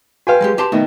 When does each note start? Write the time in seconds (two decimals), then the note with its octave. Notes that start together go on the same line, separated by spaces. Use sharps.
0.27 F#4 B4 F5 G5 G#5
0.41 F#3 G#3 G4
0.58 G4 A5 C6
0.72 B2 D#3 A3 D#4